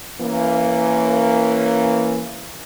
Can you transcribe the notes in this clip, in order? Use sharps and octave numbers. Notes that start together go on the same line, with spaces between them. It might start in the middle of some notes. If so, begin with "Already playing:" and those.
E3 A#3 C#4